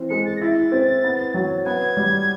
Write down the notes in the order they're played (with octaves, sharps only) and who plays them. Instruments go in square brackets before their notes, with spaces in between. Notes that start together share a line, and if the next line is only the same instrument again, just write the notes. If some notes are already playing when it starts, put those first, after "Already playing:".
Already playing: [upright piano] E3 C4
[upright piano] G#3 [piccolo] C#7
[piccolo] A6
A#6
[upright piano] E4 [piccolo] A6
[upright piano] C4
B3
F#3
[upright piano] B3 [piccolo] G#6
[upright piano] G3